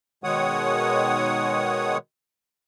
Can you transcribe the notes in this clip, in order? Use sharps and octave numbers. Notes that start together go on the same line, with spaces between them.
B2 D#3 G#3 C#5 F#5 D#6